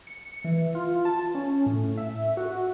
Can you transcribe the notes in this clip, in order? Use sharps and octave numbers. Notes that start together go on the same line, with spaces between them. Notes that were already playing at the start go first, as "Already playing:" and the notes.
C#7
E3
F4
A5
C#4
A2
E5
F#4